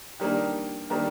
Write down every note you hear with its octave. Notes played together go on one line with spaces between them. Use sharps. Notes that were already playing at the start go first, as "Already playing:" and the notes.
D#3 G3 A#3 D4
D#3 G3 A#3 D4